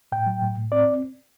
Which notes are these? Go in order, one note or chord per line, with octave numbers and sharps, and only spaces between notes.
A2 G5
F#3
A2
A2
C4 D5